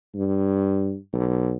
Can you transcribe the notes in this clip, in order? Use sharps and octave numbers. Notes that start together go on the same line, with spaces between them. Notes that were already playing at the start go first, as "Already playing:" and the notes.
G2
B1